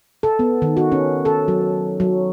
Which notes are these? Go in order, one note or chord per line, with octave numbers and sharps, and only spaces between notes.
A4
B3
D#3
F#4
C#4
A4
F#3
F#3